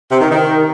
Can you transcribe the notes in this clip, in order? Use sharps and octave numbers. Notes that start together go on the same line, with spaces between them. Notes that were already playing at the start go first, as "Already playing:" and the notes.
C3
D#3
D#3